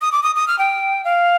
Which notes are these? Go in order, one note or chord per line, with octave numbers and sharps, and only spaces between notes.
D#6
D6
D#6
D#6
F6
G5
F5